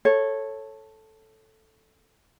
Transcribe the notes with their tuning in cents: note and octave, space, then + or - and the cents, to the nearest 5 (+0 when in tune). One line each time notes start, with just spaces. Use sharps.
A4 +0 C#5 -15